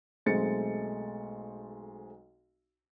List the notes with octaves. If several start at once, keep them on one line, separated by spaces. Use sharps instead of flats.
B1 G#3 A3 C4 A6 C#7